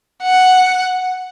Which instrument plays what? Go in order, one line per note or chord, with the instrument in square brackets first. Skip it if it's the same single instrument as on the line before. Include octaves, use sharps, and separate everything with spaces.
[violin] F#5